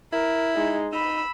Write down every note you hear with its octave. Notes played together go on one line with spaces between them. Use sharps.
E4 A#4
G#3 D#4
D#4 B5 E6